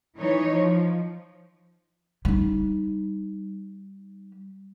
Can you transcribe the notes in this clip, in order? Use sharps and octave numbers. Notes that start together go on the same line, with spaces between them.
E3 D#4 C#5
F3
G3 D#4